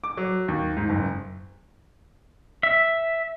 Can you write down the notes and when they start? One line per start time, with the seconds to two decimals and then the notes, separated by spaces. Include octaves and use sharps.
0.04 D6
0.17 F#3
0.48 D#2
0.76 G#2
0.89 F#1
2.63 E5